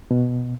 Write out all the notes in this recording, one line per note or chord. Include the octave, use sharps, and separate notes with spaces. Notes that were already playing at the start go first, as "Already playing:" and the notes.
B2